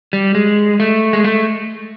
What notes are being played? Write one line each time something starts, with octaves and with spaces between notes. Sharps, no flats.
G3
G#3
A3
G#3
A3